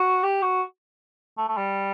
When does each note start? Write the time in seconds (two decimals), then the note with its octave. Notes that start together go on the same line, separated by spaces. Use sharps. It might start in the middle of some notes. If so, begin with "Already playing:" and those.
Already playing: F#4
0.23 G4
0.42 F#4
1.38 A3
1.49 A3
1.57 G3